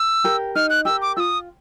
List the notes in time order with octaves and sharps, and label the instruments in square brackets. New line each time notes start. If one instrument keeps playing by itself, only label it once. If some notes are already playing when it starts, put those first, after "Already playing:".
Already playing: [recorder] E6
[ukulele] G4 A#4
[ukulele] D#4 [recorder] F6
[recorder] F#6
[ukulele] G4 A#4 [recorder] E6
[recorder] D6
[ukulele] F4 [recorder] D#6 E6